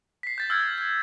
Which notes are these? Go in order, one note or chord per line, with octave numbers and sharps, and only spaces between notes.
B6 C7
G6 A6 C7
E6 F6 G6 G#6
G6